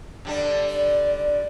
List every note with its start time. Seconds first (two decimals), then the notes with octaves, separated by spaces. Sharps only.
0.25 D3 G3 D4
0.70 D5